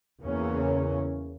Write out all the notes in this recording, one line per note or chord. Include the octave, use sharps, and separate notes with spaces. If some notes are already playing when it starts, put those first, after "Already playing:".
E2 C#3 E3 A#3 C#4